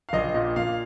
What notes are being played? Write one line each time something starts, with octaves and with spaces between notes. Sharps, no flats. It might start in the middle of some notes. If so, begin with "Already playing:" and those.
F5
A#1 D#5
A#2 D#5
A#2 F5